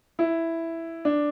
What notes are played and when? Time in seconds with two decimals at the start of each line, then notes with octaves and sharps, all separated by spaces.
0.19 E4
1.05 D4